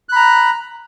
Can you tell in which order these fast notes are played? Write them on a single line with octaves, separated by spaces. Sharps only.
F#6 B5 A#5